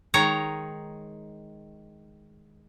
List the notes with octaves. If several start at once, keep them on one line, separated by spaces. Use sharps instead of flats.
D#3 G#3 C#5 A#5